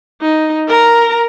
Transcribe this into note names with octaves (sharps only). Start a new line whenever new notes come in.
D#4
A#4 A#5